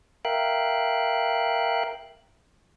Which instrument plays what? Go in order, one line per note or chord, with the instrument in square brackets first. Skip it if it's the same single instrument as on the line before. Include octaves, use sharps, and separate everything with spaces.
[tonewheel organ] A#4 E5 F5 G5 F#6